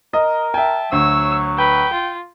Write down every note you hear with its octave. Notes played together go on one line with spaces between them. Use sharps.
A#4 D#5
E5 G5 A5
D2 F#3 C#5 E6
B4 G5
F4